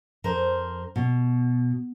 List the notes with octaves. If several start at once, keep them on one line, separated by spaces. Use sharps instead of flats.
F2 A#4 C5
B2